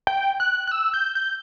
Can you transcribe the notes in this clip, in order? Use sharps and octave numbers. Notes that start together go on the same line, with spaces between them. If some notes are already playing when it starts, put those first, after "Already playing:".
G5
F#6
F#6
E6
G6
G6